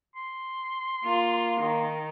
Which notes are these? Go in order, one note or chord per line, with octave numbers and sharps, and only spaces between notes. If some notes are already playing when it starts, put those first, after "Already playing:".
C6
A#3 F4
D#3